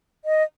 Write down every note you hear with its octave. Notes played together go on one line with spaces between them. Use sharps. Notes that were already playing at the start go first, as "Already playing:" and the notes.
D#5